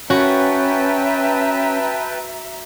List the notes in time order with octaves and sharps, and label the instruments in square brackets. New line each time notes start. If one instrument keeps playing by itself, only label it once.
[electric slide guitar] C#4 [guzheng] F#4 [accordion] B4 G5 A5 [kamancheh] E5 A#5